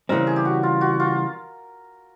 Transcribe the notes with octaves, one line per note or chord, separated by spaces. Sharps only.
C#3 E3 G3 C4 A#4
G#4
G4
F#4
F4
F#4
F4